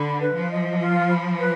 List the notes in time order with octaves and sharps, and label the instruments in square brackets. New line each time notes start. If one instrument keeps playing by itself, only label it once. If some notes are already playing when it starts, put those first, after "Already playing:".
Already playing: [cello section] D3 [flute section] B5
[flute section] B4
[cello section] F3
[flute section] D#5
F4
B5
B4